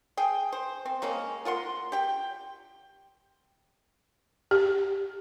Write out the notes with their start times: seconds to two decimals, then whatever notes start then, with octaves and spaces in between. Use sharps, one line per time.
0.17 G#4 G5
0.52 C5
0.85 C4
1.02 C#3 G#3 A#3 C#4
1.45 F4 A#4 F#5 C6
1.92 G4 G5
4.51 G4